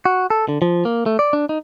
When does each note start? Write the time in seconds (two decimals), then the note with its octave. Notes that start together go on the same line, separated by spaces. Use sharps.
0.05 F#4
0.30 A4
0.49 D3
0.62 F3
0.85 A#3
1.06 A3
1.19 D5
1.33 D4
1.49 D#4